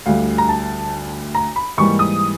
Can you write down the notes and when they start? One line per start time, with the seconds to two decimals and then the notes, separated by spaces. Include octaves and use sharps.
0.06 D2 D3 G3 F5
0.38 A#5
0.49 A5
1.35 A#5
1.56 B5
1.78 G#2 E3 G3 A#3 C#6
1.99 D#6